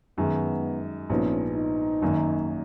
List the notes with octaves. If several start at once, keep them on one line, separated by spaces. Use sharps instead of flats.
F#2 D#3 G#3 B3
A#1 G#2 F3 B3 C#4
D#4
G#1 F#2 D#3 A#3